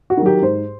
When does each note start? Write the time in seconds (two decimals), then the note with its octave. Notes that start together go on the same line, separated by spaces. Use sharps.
0.10 F#4
0.17 D#3
0.22 F#3 G4
0.42 G#2 C5